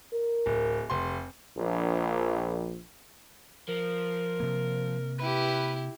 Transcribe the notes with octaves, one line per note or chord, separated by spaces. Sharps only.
A#4
D1
F1 C6
A#1
F3 A#4
C3 A#3
E4 G4 B4